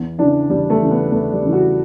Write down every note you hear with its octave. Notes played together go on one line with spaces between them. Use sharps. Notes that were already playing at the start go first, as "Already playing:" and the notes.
Already playing: E2
C#3 E3 D4
E2 G3
A3
C#3 E3
B3
E2 A3
G3
C#3 E3
F#4